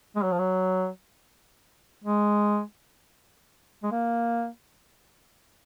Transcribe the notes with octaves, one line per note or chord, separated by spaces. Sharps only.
G#3
F#3
F3
F#3
G#3
G#3
A#3